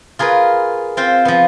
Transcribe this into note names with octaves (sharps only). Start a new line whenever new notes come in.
F4 G#4 A#4 B4
C4 F4 C5
F3 B3